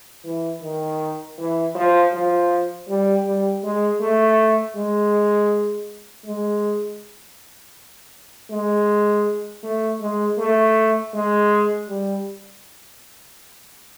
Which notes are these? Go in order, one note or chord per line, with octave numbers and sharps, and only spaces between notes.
E3
D#3
E3
F3
F3
G3
G3
G#3
A3
G#3
G#3
G#3
A3
G#3
A3
G#3
G3